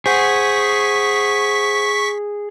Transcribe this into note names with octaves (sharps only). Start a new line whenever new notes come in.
G#4 C5 F#5 C#6 B6